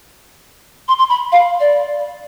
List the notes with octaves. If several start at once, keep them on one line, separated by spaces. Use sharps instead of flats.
C6
C6
B5
F5
D5